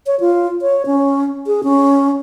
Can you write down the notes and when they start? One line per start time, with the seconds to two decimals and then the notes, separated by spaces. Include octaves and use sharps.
0.07 C#5
0.20 F4
0.62 C#5
0.86 C#4
1.47 G#4
1.63 C#4